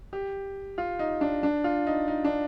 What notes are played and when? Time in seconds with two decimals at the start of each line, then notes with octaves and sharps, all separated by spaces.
0.13 G4
0.78 F4
0.99 D#4
1.21 D4
1.43 D4
1.64 F4
1.87 D#4
2.08 D#4
2.24 D4